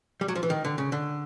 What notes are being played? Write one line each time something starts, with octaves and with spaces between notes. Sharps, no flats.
G3
F#3
F3
E3
D#3
D3
C#3
D3